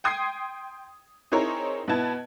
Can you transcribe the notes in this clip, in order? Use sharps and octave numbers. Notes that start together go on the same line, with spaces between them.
G5 C6 D#6 G#6 C7
C4 D#4 E4 G#4 A#4 C#5
B2 B3 E4 B4 A5 G#6